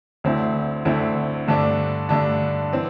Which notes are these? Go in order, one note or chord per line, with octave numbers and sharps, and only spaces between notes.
D2 D3 C4 E4
D2 D3 C4 E4
G2 D3 A3 D4
G2 D3 A3 D4
E3 C4